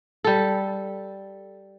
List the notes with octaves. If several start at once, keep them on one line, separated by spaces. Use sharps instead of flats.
G3 A4